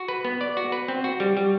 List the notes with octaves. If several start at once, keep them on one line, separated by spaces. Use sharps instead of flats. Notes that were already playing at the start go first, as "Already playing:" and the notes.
Already playing: F#4
B4
B3
D5
F#4
B4
C4
F#4
G3
G3